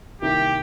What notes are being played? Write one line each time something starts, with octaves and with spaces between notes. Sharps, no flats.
C2 C3 D#3 A#3 G4